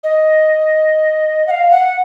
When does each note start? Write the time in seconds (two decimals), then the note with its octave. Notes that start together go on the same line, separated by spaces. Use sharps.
0.04 D#5
1.47 F#5
1.51 F5
1.71 F#5